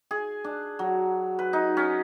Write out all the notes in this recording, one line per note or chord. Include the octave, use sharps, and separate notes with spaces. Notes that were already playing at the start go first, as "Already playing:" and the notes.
G#4
D4
F#3
B4
D#4
C#4